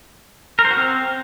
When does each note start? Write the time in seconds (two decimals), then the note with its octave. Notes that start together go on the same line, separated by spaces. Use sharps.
0.59 A#4
0.65 C5
0.71 F#4
0.77 C4